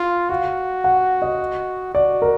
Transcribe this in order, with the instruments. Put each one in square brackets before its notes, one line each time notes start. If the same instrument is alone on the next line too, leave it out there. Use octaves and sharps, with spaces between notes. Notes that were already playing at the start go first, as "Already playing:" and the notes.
Already playing: [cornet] F4
[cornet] F#4 [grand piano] F5
[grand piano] F#5
D#5
[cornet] F#4 [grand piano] D5
[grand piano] A#4